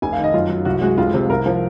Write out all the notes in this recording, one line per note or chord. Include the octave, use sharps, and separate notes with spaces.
F1 G#5
F5
D#3
D#5
F#2 F4
F#3
C2 F#4
G#3 F#4
F1 F4
C3
C2 A#4
F3